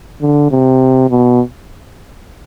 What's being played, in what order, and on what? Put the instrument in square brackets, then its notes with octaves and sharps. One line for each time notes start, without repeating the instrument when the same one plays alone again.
[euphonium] D3
C3
B2